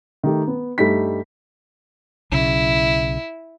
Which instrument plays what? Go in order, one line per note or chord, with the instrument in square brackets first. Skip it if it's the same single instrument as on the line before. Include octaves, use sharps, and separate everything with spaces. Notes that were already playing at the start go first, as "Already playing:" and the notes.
[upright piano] D#3 A3 G4
B3
G2 G3 A3 D#4 B6
[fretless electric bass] B1 C#3 [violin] E4